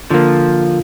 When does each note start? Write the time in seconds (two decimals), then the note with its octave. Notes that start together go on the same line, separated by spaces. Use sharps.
0.10 D3 F3 A#3